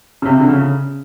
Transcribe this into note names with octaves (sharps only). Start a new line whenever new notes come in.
C#3
C3
D3
C#3